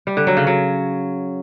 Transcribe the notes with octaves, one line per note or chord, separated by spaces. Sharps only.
G3
D3
F#3
C#3
F#3